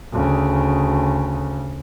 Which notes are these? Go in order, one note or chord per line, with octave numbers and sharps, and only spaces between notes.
D2 C#3